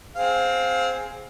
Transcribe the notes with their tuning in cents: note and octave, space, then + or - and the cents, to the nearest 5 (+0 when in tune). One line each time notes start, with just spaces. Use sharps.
C4 +0 G#4 +0 F5 +20